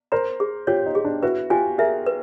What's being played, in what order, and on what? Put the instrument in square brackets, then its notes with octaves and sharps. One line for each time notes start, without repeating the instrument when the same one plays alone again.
[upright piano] A#4 C5 [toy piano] A#5
[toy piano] G#4
[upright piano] F4 G4 [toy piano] C#5
[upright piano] D#4
[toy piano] G#4
[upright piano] D4
[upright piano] E4 F#4 [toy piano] B4
[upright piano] F4 G4 [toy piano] G#5
[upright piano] G#4 A#4 [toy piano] E5
[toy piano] B4